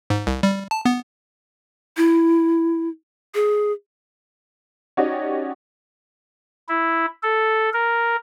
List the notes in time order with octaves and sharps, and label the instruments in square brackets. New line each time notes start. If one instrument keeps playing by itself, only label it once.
[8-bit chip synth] G#2
C2
G3
A5
B3
[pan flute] E4
G#4
[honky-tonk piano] C#4 D#4 F#4 G4 D5 D#5
[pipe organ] E4
A4
A#4